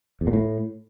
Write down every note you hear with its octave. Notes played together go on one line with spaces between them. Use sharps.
E2
A#2
A2